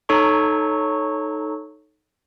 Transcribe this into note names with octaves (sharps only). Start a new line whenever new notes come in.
D#4 A4 C#5 A#5 C#6